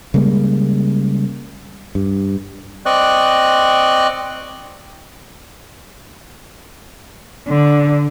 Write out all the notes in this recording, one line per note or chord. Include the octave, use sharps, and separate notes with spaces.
C#3 G3 G#3 A#3
G2
C4 D5 D#5 C#6 F#6
D3